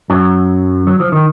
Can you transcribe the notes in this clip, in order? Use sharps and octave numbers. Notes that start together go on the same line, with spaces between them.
F#2 F#3
F#3
F3
D#3